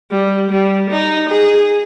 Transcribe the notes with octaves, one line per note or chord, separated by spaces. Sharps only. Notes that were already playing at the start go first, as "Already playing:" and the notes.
G3
G3
D#4
G#4